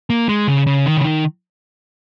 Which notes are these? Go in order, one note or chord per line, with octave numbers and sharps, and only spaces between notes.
A#3
G#3
C#3
C#3
D#3
C#3
D#3